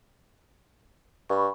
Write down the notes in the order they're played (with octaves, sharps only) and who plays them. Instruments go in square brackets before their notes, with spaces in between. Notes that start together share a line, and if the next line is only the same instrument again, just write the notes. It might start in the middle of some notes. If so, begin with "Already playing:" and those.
[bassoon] G2 [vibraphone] B5 C#6